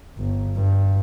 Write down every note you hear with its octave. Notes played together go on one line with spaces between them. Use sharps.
G1
G2